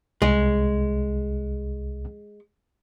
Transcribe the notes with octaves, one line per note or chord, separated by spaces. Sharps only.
C2 G#3